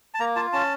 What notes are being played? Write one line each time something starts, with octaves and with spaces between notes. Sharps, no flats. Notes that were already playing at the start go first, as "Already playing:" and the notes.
A5
A#3 A#5
F4 A5
C#4 A5